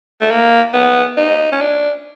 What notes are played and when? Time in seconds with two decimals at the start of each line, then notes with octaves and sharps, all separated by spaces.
0.21 A3
0.30 A#3
0.73 B3
1.17 D#4
1.52 C#4
1.61 D4